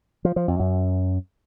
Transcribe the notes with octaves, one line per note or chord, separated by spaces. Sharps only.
F3
F3
F2
F#2